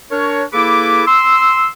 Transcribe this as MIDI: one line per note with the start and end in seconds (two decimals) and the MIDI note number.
0.11 0.43 62
0.11 0.43 70
0.11 0.43 73
0.53 1.03 58
0.53 1.03 64
0.53 1.03 68
0.53 1.03 69
0.53 1.03 71
0.53 1.03 86
1.07 1.68 84
1.07 1.68 88